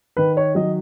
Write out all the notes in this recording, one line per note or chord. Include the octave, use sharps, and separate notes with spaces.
D#3 B4
C#5
F#3 D#5